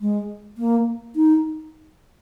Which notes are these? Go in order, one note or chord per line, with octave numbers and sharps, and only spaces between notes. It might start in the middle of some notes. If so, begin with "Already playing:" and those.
G#3
A#3
D#4